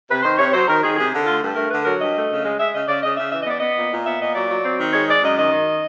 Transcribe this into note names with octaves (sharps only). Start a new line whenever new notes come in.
C3 B4
D#3 C5
C3 C#5
F#3 C5
D#3 A#4
D#3 G#4
C3 G#4
D3
A3 F4
G2
A3 A#4
D3 B4
F#3 A#4
G2 D#5
A3
C#3
G#3
G#3 E5
C#3 D#5
C#3 D5
C#3 D#5
C#3 E5
E3 E5
D#5
B3 D5
B3 D#5
A#2
A#2
B3 E5
A#2 D#5
F#3 D5
F#3
C4
D#3
G#3 C#5
G#3 D5
F#2 D#5
D#3 D#5
D#3